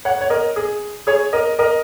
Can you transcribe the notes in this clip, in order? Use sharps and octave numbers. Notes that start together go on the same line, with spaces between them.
C#5 F#5
C#5
A#4 D#5
G#4
G#4 C#5
A#4 D#5
A#4 D#5